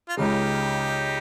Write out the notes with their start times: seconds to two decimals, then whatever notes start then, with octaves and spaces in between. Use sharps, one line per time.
0.09 F4
0.17 C#2 C#3 G#3 D#4 G4